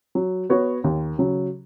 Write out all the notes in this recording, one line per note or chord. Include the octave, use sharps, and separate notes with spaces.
F#3
B3 F#4 C#5
D#2
C#3 F#3